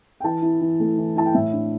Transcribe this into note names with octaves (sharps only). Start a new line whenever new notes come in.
G5
E3 A5
E4
E3
A3
E3
E4 A5
G5
A2 E5
D4